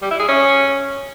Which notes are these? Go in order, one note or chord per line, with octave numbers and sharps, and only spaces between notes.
G3
E4
G#4
C#4